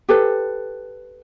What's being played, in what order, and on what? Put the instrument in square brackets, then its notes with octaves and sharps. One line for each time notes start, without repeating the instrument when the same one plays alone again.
[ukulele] G4 A4 B4 C5